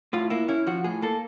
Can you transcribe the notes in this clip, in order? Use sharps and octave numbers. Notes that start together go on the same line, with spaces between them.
A2 F4
A#3 E4
C#4 E4
F3 F#4
A2 G#4
A#3 A4